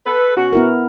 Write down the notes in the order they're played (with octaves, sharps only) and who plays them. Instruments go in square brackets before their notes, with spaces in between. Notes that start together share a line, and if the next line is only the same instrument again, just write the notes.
[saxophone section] A4 B4
B2 C#4 F#4
[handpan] B3 E4 A#4